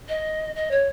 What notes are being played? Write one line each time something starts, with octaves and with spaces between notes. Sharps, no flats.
D#5
D#5
C#5